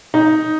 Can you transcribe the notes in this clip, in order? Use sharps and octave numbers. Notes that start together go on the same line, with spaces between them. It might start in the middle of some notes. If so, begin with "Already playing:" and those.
D#4